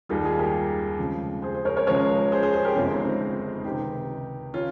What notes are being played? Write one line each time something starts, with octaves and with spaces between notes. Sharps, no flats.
D#2 D#3 G3 F4 G#4
F4 G#4
G4 A#4
F2 C#3 F3 G#3
G#4 C5
G#4 C5
A#4 C#5
A#4 C#5
C#2 C#3 F3 G#3 A#4 C#5
G#4 C5
G#4 C5
G#4 C5
G4 A#4
G1 F2 C#3 G#3 C#4 F4
C4 D#4
C4 D#4
C#2 C3 D#3 D#4 G4
C#3 C#4 F4